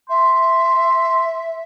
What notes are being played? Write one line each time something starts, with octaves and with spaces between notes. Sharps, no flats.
E5 C6